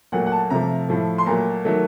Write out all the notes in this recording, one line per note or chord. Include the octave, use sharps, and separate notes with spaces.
A#2 F#3 A3 F#5
F#5
A5
C3 F3 A3 A#5
A2 F3 A3
C6
A#2 F#3 A3 A#5
D#3 F#3 A3